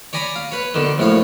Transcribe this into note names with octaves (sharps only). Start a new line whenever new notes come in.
C#5 D5 G#5 A#5 B5 D6
F5
B4 C#5
B2 D3 D#3
A#1 F#2 A2 C#5 F5